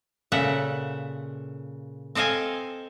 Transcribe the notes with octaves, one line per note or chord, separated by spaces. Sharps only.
A#2 C#3 A4 E5 F#5
C4 A4 D#5 F5 G#5